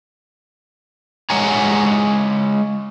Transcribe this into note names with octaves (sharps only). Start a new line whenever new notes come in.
G#3 C#5 D#5 F#5 G#5 A#5